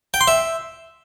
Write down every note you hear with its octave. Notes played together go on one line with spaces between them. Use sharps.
G5
C6
E5